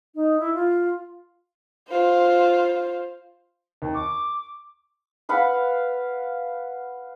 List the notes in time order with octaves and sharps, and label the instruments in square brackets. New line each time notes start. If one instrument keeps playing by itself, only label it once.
[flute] D#4
E4
F4
[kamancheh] F4 C5
[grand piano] D#2
[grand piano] C#6 [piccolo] D6
[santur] B4 F5 F#5 B5